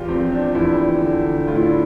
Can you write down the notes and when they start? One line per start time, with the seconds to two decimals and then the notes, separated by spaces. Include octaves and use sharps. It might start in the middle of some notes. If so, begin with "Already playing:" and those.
Already playing: E2 F4 G4
0.08 F3 C4
0.32 D4
0.55 E2 E4
1.01 D3
1.48 A2 F4
1.55 E4
1.63 D4